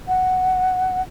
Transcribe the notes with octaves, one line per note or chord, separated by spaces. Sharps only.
F#5